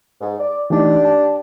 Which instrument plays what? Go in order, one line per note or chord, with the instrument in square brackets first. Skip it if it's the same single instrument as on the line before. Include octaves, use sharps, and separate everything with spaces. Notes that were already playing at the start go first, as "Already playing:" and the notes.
[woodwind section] G#2
D5
[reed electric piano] E3 A3 D#4 [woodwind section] D4 G4
[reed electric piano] A5